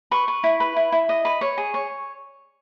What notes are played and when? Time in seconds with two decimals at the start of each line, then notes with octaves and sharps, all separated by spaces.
0.11 B4 C#6
0.28 B4
0.44 E4
0.60 B4
0.76 E4
0.92 E4
1.09 D#5
1.25 B4
1.41 C#5
1.58 G#4
1.74 C#5